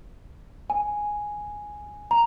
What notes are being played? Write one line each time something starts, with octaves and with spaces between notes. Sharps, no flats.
G#5
A#5